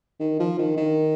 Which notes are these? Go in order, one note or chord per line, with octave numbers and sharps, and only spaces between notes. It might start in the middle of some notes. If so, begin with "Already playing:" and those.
D#3
F3
D#3
D#3